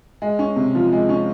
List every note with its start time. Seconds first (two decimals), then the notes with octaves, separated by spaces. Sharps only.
0.22 G#3
0.39 C#4
0.56 C3
0.75 F3
0.93 G#3
1.09 C#4